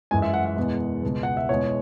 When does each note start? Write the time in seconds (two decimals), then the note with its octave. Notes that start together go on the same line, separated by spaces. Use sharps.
0.11 F#2 E3 G#3 G#5
0.22 E5
0.34 F#5
0.45 F#5
0.57 E2 B2 G#3
1.03 C#2 B2 G#3
1.23 F#5
1.37 E5
1.49 E2 B2 G#3 C#5